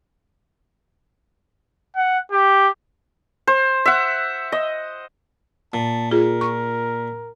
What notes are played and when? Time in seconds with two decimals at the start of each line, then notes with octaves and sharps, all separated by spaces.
1.96 F#5
2.31 G4
3.47 C5
3.86 E5 F#5
4.52 D#5
5.74 A#2 A5
6.11 F4 G#4 A#4
6.41 C#6